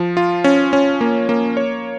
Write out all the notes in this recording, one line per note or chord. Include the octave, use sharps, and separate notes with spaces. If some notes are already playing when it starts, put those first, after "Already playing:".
Already playing: F3
F4
C#4
C#4
A#3
A#3
C#5